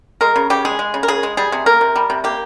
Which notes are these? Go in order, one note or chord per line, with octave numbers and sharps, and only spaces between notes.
G#3 A#4
C#3
C#3 G4
G#3 G#4
G#3
C#3
A#4
C#3 G#4
G#3
G3 G#4
C3
A#3 A#4
C3
G3
C3
A#3 G4